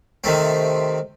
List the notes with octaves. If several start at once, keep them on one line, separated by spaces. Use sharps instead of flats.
C3 D#3 A3 C4